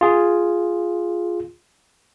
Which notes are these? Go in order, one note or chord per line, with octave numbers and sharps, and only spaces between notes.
F4 G#4